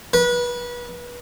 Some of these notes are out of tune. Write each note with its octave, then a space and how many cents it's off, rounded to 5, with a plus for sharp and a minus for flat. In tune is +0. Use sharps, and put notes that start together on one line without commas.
B4 -30